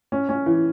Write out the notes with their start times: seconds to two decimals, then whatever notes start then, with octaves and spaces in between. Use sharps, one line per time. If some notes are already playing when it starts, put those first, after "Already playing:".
0.12 C#4
0.29 C#4
0.46 E3